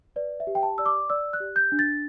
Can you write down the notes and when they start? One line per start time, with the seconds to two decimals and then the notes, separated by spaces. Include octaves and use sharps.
0.16 B4 D5
0.40 E5
0.47 G4
0.55 G5
0.63 A5
0.78 D5 E6
0.86 D6
1.10 D5 E6
1.33 F#6
1.40 G4
1.56 G6
1.72 D4
1.79 A6